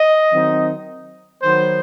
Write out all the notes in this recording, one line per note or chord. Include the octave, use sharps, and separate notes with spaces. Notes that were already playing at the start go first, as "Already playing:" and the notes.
Already playing: D#5
D#3 F#3 C4 D#4
D#3 F#3 B3 C5